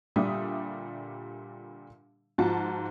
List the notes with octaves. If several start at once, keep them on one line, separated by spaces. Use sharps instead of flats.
A#2 D3 G3 G4 E5 D#6
G#2 F3 F4 F#4 A5